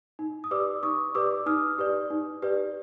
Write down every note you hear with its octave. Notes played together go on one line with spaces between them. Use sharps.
D#4
D#6
G4 B4 D5 D6 E6
D#4 C#6 D#6
G4 B4 D5 D6 E6
D#4 D#6 F6
G4 B4 D5
D#4
G4 B4 D5